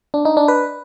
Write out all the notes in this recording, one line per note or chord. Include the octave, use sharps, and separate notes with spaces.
D4
D#4
D4
B4